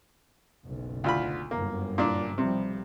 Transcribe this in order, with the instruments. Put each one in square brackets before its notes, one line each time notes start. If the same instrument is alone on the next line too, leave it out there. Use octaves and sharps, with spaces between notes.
[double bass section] F#1 B1
[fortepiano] D2 F4 B5
[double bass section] G1 F#2 [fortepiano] A#3
[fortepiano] A#2 A#3 D4
[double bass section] B1 F3 G3 [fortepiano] C3